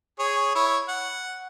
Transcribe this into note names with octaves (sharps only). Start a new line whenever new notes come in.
G#4 C#5
E4 C#5
F#5